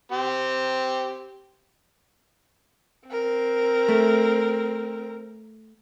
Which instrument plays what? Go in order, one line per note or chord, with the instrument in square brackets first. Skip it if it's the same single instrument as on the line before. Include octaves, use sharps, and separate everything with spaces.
[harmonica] C4 G4
[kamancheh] C4 A#4
[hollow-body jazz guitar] A3